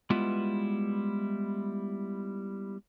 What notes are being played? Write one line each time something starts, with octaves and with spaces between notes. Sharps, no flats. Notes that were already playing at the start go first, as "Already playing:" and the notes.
G3 G#3 B3 E4 F4 B4